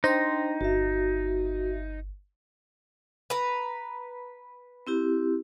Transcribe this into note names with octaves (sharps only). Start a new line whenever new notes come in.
D4 D#4 C5 G5 C6 A#6
G1 F#4 E5
B4 A#5
C4 E4 G4